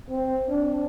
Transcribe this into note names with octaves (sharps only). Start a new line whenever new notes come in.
C4
D4